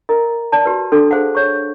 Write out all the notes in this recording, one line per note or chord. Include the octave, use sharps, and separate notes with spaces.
A#4 D#5 A#5
D5 A5
F#4 G4 B4
D4 A4 C6
G#4 C5 F5 F#5
C#5 C#6